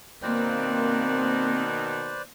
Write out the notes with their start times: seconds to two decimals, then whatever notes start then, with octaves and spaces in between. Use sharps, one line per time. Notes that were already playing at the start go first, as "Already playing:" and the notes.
0.22 B2 D#3 A#3 C4 B4 C5 D5